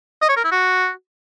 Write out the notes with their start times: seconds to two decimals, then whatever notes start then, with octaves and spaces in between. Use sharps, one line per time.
0.22 D#5
0.29 C#5
0.37 A#4
0.44 E4
0.52 F#4